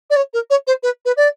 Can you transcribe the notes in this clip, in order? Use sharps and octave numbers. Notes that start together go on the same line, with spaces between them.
D5
C#5
A#4
C#5
C5
B4
B4
D5